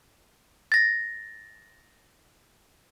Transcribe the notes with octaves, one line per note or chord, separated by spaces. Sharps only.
A6 A#6